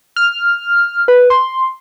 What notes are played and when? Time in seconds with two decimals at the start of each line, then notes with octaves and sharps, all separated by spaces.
0.16 F6
1.08 B4
1.30 C6